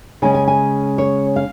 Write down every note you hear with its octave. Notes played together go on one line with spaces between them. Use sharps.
C#3 G#3 C#4 G#5
G#5
G#5
C#5
F5